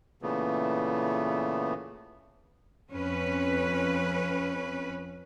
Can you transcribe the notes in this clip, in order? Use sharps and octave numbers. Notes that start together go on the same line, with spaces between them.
A#2 C#3 E3 A3 B3
F2 C#4 B4